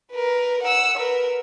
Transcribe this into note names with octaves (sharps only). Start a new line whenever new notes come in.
A#4 B4
F#5 E6
A#4 B4